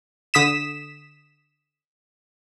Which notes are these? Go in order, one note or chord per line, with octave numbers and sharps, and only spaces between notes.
D3 D#6 B6 E7